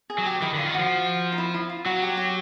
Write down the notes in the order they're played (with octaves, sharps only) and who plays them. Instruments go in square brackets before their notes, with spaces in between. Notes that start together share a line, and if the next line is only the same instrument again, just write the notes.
[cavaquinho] G#4
[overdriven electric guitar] F#3
[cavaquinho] G4
[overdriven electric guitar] D#3 [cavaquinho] E4
[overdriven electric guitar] D3 [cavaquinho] F4
[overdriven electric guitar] D#3
[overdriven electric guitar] F3 [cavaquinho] F#4
[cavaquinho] D#4
E4
E4
F4
[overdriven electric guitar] F#3 [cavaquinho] F#4
[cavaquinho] G4
G4